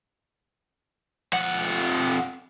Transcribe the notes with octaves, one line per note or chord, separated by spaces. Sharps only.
F2 F#5